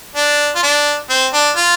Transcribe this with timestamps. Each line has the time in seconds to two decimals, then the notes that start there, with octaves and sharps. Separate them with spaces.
0.16 D4
0.55 F4
0.63 D4
1.10 C4
1.34 D4
1.56 F4